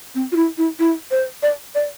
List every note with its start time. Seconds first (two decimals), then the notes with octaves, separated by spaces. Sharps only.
0.15 C4
0.32 F4
0.36 E4
0.58 E4
0.79 E4
1.11 C5
1.42 D5
1.75 D5